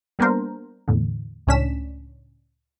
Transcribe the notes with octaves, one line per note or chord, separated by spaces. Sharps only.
G3 A#3 B3 D4 A#4 C5
E2 A2 D3
C#2 A2 C#4 D4 B6 E7